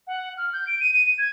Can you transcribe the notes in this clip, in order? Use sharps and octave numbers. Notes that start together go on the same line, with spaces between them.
F#5
F6
G6
D7
D#7
D#7
G#6